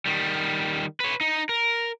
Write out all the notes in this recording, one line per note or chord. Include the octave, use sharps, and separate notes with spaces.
D#3 G3
B4 C#5
D#4
A#4